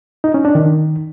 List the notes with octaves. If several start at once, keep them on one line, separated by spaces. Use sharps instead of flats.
D#4
C#4
D4
D#3